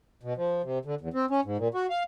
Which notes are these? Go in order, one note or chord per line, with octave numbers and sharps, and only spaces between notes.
B2
F3
C3
D3
E2
C4
C#4
G#2
A#2
F#4
F5